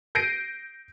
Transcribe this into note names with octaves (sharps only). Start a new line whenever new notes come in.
G6 A#6 C7 D7 D#7